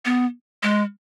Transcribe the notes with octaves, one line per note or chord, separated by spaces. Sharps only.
B3
G#3